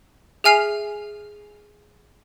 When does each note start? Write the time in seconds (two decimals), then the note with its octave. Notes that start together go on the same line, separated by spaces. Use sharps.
0.44 G#4 E5 G#5 F6 C7 F7